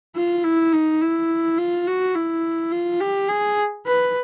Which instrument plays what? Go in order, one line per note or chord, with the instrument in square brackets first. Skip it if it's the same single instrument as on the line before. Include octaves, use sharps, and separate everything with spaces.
[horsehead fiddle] F4
E4
D#4
E4
F4
F#4
E4
F4
G4
G#4
B4